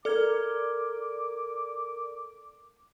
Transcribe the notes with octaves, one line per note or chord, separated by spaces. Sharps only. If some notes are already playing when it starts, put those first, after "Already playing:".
A4 A#4 D5 D6 F6 G#6